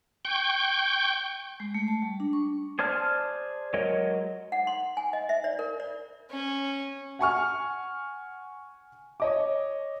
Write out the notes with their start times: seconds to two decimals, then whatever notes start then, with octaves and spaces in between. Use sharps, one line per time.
0.25 G5 C#6 G6
1.60 G#3
1.74 A3
1.88 A5
2.02 G3
2.20 D4
2.33 C#6
2.79 G#4 C5 D5 A5 F6
3.74 F#3 G#3 A#4 C#5 D#5
4.52 F#5
4.67 C6
4.97 G#5
5.13 D#5
5.29 E5
5.44 D5
5.59 A#4
5.80 D5
6.31 C#4
7.19 F#5 G#5 C#6 F6
9.20 C#5 D#5 D6